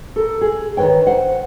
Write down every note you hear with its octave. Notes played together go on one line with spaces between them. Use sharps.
A4 A#4
G#4
D#3 G3 B4 C#5 G5
C5 F#5